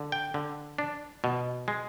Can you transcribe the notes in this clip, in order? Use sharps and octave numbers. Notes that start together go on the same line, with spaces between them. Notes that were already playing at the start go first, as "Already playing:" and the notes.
Already playing: D3
G5
D3
D4
B2
G#3